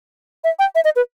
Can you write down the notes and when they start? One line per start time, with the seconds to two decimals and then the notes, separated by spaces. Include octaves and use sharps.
0.44 E5
0.59 G5
0.75 E5
0.85 D#5
0.96 B4